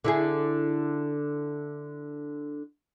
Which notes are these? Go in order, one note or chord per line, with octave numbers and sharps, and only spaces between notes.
D3 E4 G#4